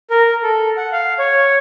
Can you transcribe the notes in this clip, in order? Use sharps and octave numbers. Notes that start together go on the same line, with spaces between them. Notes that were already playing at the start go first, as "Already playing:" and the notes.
A#4
A4
F#5
F5
C#5